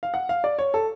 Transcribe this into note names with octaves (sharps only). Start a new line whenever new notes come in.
F5
F#5
F5
D5
C#5
A4